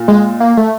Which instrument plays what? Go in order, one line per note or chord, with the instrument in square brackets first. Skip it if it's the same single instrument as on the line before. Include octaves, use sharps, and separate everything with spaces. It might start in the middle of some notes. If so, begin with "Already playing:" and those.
Already playing: [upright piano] A#2
[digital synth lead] G#3
A#3
A3